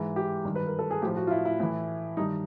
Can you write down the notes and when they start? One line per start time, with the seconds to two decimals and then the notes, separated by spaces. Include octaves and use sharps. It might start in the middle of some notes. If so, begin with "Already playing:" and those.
Already playing: G#2 E3
0.16 G4
0.45 G2 D#3
0.56 B4
0.67 A#4
0.79 A4
0.91 G#4
1.02 A2 G4
1.06 F3
1.17 F#4
1.27 F4
1.31 E4
1.45 E4
1.60 A2 E3
2.17 G2 D#3 D#4